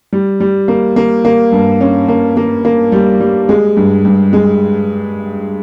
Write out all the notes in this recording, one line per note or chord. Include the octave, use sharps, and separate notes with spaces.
G3
G3
A#3
A#3
A#3
G2
C#4
A#3
A#3
A#3
G3
G3
G#3
G2
G2
G#3